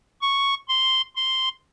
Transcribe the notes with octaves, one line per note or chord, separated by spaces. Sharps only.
C#6
C6
C6